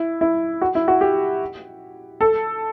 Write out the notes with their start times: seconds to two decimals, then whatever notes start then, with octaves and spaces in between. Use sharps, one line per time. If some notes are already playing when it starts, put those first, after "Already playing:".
Already playing: E4
0.21 E4
0.61 F#4
0.75 E4
0.88 F#4
1.01 G4
2.21 A4